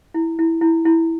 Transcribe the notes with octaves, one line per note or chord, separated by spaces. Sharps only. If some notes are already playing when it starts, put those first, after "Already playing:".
E4
E4
E4
E4